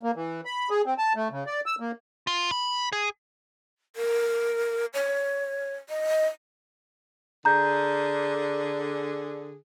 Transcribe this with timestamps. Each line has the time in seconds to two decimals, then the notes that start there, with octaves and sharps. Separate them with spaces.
0.03 A#3
0.16 E3
0.45 B5
0.70 G#4
0.86 C4
0.98 A5
1.16 A3
1.31 C#3
1.47 D5
1.66 E6
1.80 A#3
2.27 F4
2.51 B5
2.92 G#4
3.96 A#4
4.94 C#5
5.89 D#5
7.45 D3 G#4 A#5 G6